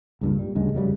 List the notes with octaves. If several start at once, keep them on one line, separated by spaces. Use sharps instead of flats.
C#2 G2 A#2
G3
D2 G2 C#3 G#3
F1 F#2 C#3 G3